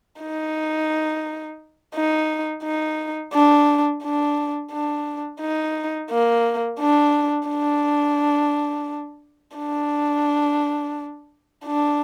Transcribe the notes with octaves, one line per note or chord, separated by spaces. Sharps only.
D#4
D#4
D#4
D4
D4
D4
D#4
A#3
D4
D4
D4
D4